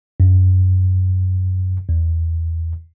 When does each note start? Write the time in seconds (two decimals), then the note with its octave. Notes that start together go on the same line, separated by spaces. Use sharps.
0.20 F#2
1.89 E2